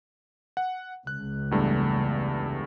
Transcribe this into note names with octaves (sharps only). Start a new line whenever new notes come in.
F#5
C#2 F#6
E2 G2 A3